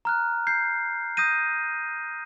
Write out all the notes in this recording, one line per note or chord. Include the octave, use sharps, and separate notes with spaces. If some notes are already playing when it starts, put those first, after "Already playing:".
A#5 F6 F#6
G6 C7
D#6 G6 A#6 D#7